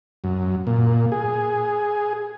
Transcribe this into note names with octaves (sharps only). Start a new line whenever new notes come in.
F#2
A#2
G#4